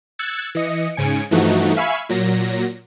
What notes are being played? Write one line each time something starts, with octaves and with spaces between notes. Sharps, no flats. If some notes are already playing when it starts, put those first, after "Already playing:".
E6 F#6 G#6 A6 C#7
E3 D#5 C#7
G#2 C#3 G#5 C#7 D7
G2 E3 F3 A3 D#4 F#4
E5 F5 G#5 B5 C#6
A#2 F#3 A#6